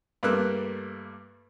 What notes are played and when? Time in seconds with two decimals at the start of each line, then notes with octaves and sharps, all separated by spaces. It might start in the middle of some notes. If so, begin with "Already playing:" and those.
0.23 G2 G3 A3 A#3 E6 F#6